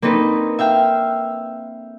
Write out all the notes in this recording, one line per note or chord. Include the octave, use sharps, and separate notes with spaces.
A#3 C4 D4 D#4 A4 B4
E5 F5 G5 F6